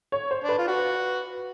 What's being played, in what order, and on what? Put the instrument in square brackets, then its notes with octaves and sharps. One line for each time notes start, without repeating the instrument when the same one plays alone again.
[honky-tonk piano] C#5
C5
[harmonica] D4
[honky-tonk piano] B4
[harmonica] F4
F#4